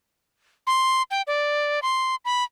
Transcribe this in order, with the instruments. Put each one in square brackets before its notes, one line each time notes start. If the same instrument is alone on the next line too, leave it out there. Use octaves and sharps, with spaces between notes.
[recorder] C6
G5
D5
C6
B5